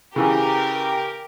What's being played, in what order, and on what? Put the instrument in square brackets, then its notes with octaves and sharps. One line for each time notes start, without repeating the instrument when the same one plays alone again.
[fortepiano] C#3 E3 [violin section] G4 A#4